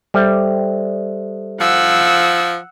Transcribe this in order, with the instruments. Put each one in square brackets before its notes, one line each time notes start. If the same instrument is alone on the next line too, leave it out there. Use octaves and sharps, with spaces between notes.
[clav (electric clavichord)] G3 [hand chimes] A4 C5 E5
[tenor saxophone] F3 [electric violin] F#5 E6